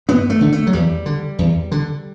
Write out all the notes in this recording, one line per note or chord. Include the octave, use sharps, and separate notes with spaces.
G2 B3
A3
D3
A3
F#3
E2 G3
D3
E2
D3